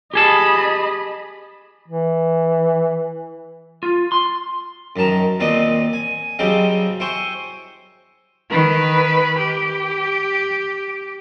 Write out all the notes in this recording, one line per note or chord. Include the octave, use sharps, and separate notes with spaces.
G4 G#4 D#5 A5 B5
E3
F4
C6
F#2 D#3 A5 A#5
D#2 A#2 C4 B4 D5 D#5
G#5
C#3 F#3 G3 C4 D#5 G5
E4 C5 G5 G#5 C#6
D#3 B4
G4